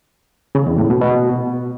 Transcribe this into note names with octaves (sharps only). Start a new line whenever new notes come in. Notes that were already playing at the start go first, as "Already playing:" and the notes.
C#3
E2
A2
B2
B2